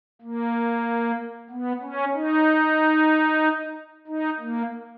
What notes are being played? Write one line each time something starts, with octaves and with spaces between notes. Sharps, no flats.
A#3
B3
C#4
D#4
D#4
A#3